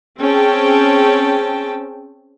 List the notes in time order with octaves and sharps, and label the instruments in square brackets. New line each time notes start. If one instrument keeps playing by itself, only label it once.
[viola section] C4 C#4 G#4 G5 A5